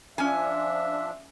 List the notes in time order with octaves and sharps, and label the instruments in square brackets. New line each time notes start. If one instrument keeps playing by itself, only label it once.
[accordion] F3 D4 [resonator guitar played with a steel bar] C#4 G#5 [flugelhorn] E5